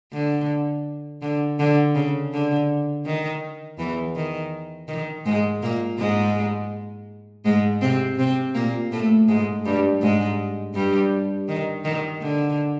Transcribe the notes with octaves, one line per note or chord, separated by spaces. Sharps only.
D3
D3
D3
C#3
D3
D#3
E2 E3
D#3
D#3
G#2 G#3
A#2 A#3
G#2 G#3
G#2 G#3
C3 C4
C3 C4
A#2 A#3
A2 A3
G#2 G#3
G2 G3
G#2 G#3
G2 G3
D#3
D#3
D3